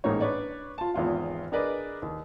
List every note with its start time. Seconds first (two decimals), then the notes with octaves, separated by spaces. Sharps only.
0.04 A1 G#2 A#3 D#4 C#5
0.21 D4 B4 C#5 D5
0.78 F4 A5
0.94 G#1 E2 F4 F5
1.52 D4 G#4 A#4 B4 D5 D#5
2.02 D#2